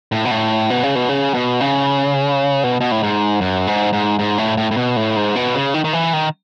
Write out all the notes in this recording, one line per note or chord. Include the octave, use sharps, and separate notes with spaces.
A2
B2
A2
B2
C#3
B2
C#3
B2
C#3
B2
B2
A2
G#2
F#2
G#2
G#2
G#2
A2
A2
A2
B2
A2
G#2
B2
C#3
D#3
D#3
E3
D#3